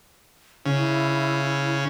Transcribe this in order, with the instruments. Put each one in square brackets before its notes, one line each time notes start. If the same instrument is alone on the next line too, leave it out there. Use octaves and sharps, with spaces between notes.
[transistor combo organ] C#3 [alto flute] E4